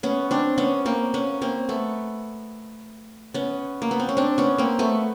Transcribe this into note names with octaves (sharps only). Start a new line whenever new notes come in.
B3 C#4
C4 D4
B3 C#4
A#3 C4
B3 C#4
A#3 C4
A3 B3
B3 C#4
A#3
B3
C4
C#4
C4 D4
B3 C#4
A#3 C4
A3 B3